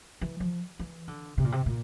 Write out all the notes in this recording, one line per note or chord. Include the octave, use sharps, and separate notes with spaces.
E3
F3
E3
D3
C3
A#2
C3
A#2